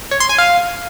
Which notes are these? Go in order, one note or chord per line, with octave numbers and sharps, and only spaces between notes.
C#5
C6
G#5
F5